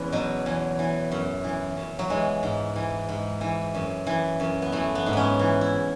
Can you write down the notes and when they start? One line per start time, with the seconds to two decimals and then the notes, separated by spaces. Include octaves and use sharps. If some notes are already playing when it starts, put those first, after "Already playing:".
Already playing: E2 B3 C#4
0.12 B2 F#3
0.46 E2
0.79 E3
1.11 F#2
1.44 E3
1.77 F#2
1.99 F#3
2.10 E3 G#3
2.43 G#2
2.76 E3
3.09 G#2
3.41 E3
3.74 F#2
4.07 E3
4.40 F#2
4.62 B3
4.72 E3 A3
4.95 B3
5.06 G#2
5.13 B3 C#4
5.39 E3
5.61 E4